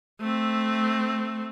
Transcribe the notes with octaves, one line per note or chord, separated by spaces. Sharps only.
A3 C4